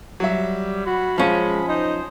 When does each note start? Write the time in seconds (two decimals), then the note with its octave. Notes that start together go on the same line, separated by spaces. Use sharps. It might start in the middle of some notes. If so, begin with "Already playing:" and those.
0.20 F#3 G3 E5
0.86 F#4 B5
1.18 F3 G#3 C#4
1.68 D#4 C5